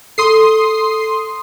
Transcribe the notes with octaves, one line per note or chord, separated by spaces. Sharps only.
A4 C6 D#6 C7